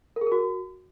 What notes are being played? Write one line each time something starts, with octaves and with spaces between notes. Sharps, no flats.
A#4
G#4
A#4
F#4